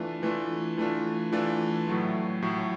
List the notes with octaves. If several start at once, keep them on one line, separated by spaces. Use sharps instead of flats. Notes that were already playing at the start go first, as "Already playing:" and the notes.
Already playing: E3 A3 D4 F4
E3 A3 D4 F4
E3 A3 D4 F4
E3 A3 D4 F4
A2 F#3 A3
A2 F#3 A3